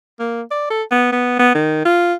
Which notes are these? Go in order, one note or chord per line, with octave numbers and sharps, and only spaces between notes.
A#3
D5
A4
B3
B3
B3
D#3
F4